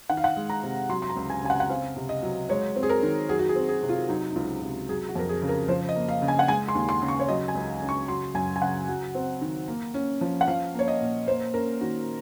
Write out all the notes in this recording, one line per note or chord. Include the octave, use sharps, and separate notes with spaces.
D#3 F#5
F5
F#5
G#3
A#5
C3
F#3 C6
C6
A#5
C#2
G#5
C#3 G#5
F#5
F#5
C4 F5
C3
D#5
F#3
G#3 C#5
C4
G#4
A#4
D#3
F#3 G#4
F#4
G#4
C4
G#4
C3
F4
F#3 D#4
D#4
C#2 F4
C3
F#3 G#4
F#4
F2 A#4
G#4
C#3
A#4
F3 C5
D#5
A#3
F5
C#3
G#5
F#5
G#3 G#5
C6
D#2
C6
C#3
C#6
C#5
F#3 D#5
G#5
C#2
C#3
C#6
F#3 C6
F#2 G#5
G#5
C#3 F#5
F#3
C4
D#3
A#3
C#4
F3
F#5
F3 F5
A#3 C#5
D#5
A#2
A#3 C5
C#4 A#4
D#3 F#4